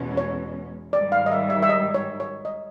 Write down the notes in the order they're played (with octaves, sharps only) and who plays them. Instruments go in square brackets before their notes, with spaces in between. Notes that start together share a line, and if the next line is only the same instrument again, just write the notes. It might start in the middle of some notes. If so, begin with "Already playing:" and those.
Already playing: [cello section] E2 B2 G#3 C#4
[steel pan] C#5
[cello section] G#2 D#3 G3 [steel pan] D5
[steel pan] F5
D#5
E5
E5
E5
D#5
C#5
C#5
D#5